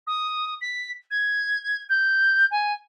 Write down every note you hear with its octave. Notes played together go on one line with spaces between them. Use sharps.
D#6
B6
G#6
G6
G#5